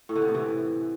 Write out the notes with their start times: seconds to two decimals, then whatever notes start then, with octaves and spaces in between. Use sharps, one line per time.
0.09 A2
0.15 D3
0.22 C3
0.28 A2
0.34 E3